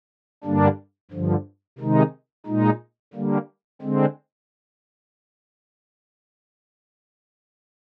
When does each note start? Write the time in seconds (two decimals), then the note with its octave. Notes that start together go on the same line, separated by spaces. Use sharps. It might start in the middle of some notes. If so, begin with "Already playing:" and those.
0.44 G2 D3 G3 A#3 D4
1.11 G2 D3 F3
1.79 C3 D#3 G#3 D#4
2.46 A#2 G#3 D#4
3.13 D3 G3 A#3
3.82 D3 G#3 C4